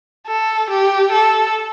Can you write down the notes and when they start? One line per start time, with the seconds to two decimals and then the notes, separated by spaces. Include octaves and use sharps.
0.27 A4
0.70 G4
1.12 A4